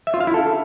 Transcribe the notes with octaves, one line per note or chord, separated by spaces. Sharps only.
E5
F4
F5
E4
A4